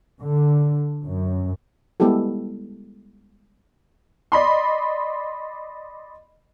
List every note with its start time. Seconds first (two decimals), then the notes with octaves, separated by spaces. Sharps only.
0.21 D3
1.05 F#2
2.00 G3 G#3 B3 E4 G4 A4
4.32 D5 D#5 B5 C6